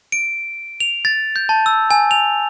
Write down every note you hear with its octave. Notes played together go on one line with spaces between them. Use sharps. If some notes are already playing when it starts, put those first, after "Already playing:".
D7
F7
A6
G6
A5
E6
G#5
F7